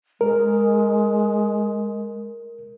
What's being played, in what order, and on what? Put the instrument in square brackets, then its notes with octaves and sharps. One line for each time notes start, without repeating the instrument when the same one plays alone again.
[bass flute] G#3 [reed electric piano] A#4